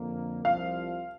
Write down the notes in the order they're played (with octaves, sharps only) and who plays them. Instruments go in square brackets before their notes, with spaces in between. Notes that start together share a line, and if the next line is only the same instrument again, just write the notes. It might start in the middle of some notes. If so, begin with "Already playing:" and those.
Already playing: [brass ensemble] F2 D3 A#3
[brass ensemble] C2 C3 F3 [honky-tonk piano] F5